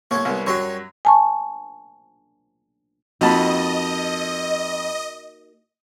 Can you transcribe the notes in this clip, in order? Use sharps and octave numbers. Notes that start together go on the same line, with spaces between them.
C2 A#3 A4 C#5 G#6
C2 G3 B3 A#4
F#2 F#3 C#5 G5 C6
G#5 A5 C#6
F2 A#3 D#4 F#4 D#5 A5 B5